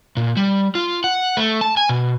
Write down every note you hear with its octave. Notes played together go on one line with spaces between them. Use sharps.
A#2
G3
F4
F#5
A3
A5
G#5
B2